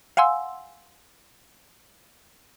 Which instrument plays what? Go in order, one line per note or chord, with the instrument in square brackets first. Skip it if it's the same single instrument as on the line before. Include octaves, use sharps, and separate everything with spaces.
[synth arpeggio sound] F5 F#5 G#5 C6 E6